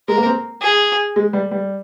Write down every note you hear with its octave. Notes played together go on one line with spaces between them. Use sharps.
G#3 A#4
A#3
C4
G#4
G#3
G3
G3